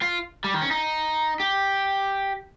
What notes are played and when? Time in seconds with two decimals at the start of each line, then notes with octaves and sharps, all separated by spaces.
0.02 F4
0.44 G3
0.54 D#3
0.62 C#4
0.71 D#4
1.40 G4